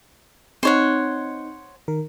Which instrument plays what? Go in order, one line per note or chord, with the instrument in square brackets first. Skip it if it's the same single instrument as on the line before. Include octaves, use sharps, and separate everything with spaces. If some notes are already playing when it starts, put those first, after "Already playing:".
[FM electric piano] C4 D#4 [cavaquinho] C5 C#5 F#5
[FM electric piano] D#3 A#4